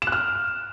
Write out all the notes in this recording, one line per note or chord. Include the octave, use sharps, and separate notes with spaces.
E7
F#6
F6